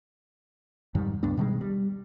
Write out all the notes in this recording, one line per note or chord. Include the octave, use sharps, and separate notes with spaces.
F2 G#2 D#3 G3
C#2 G2 B3 D4
B2 D#3 G3 G#3
G3